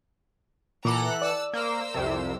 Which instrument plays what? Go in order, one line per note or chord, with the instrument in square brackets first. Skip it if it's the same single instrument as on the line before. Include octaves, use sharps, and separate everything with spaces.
[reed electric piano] A#2 D6 [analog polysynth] E3 F#5 F#6 [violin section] A4 A#5
[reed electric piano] D5 [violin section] A5 E6
[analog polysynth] A#3 [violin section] A#4 C5 E6
[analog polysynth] C2 F2 C3